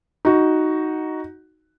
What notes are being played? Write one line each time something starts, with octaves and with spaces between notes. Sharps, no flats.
D#4 F#4